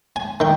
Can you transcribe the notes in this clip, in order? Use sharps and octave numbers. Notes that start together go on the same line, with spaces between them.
G#5
D#3 G5